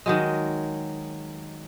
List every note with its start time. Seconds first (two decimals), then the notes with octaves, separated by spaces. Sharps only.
0.06 D#3 F#3 G#3